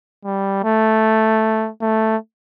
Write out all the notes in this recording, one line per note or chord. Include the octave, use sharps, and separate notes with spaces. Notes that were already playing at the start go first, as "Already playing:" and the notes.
G3
A3
A3